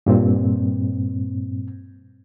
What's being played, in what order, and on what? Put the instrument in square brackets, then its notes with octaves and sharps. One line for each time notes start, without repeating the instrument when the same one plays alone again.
[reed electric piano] G2 A#2 C4